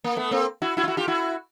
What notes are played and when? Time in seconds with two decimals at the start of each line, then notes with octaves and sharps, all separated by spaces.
0.04 A#3
0.17 A3 B3
0.31 A#3 C4
0.62 E4 F#4
0.77 E4 F#4
0.84 F4
0.88 E4 F#4
0.97 F4 G4
1.08 E4 F#4